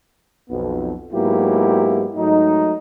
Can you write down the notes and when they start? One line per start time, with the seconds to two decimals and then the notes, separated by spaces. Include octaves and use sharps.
0.50 B1 F2 B3
1.13 G#2 F#3 A#3 B3 E4 G4
2.17 G#2 F#3 A3 D#4